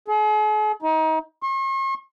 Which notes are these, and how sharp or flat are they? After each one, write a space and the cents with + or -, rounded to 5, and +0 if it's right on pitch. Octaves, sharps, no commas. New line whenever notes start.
G#4 +45
D#4 +30
C#6 -45